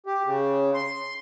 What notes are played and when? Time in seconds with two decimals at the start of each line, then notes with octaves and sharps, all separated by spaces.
0.06 G4
0.25 C#3
0.74 C6